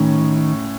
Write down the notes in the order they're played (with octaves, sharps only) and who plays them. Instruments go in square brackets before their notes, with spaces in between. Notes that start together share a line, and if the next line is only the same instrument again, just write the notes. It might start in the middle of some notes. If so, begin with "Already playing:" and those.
Already playing: [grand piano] A2 C#4 [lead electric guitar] D#3